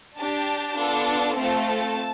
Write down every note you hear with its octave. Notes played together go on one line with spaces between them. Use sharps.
D4 G4 A5
B3 D4 F4 A4
A3 C4 F4 A4 A5